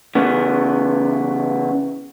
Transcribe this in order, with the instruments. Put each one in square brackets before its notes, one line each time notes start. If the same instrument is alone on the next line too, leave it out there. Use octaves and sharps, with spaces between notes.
[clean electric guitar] C#3 E3 B3